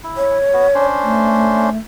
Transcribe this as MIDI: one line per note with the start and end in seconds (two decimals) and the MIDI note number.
0.04 0.38 64
0.17 0.84 73
0.53 0.67 59
0.53 0.67 66
0.75 1.70 61
0.75 1.70 62
0.75 1.70 72
1.03 1.77 57